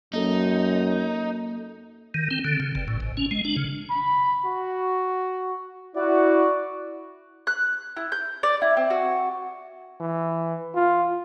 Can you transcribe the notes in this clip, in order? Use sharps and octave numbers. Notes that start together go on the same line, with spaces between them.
F#2 A#3 D#4 A4
D#3
C4
D3
C#3
G1
A2
G#1
C#4
G#3
D4
C#3
B5
F#4
E4 F#4 D5
F#6
E4
G6
D5
E4
C4
F#4
E3
F4